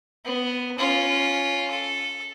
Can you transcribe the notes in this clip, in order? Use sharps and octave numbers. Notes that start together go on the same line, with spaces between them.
B3
C#4 F4
A4